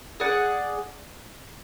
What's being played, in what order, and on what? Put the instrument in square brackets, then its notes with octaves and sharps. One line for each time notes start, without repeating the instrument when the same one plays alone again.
[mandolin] G#4 D5 F#5